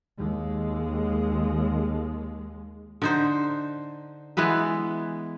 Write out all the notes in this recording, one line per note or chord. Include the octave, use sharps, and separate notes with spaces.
D#2 G#3
D3 D#4 C5
E3 G#3 B3 B4